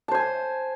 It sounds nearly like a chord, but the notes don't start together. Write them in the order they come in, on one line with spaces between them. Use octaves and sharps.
A5 C5 G#5